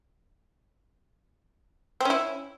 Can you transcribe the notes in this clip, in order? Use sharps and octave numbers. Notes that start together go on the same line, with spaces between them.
C4 C#4 E4